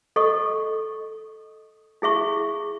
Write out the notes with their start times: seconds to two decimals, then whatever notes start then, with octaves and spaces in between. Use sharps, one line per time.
0.16 A4 D#5 C#6 D#6
2.02 E4 G#4 E5 C#6